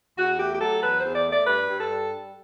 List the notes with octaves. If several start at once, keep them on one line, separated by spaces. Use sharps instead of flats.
E2 F#4
A3 G4
G4
F#3 A4
E2 B4
C5
E2
D5
A3
D5
G2 B4
G2
A4
G3